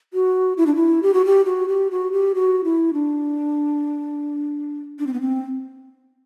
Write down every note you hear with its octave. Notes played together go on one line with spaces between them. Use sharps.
F#4
E4
D4
E4
G4
F#4
G4
F#4
G4
F#4
G4
F#4
E4
D4
D4
C4
B3
C4